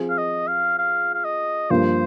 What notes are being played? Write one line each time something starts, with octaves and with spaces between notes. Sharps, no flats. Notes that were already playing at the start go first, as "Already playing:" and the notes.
Already playing: F3 C4 F4 G#4
F5
D#5
F5
F5
F5
D#5
G2 F3 A#3 C5